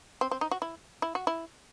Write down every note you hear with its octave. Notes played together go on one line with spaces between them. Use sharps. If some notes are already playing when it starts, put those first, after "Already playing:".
C4
C4
D#4
F#4
E4
E4
F#4
E4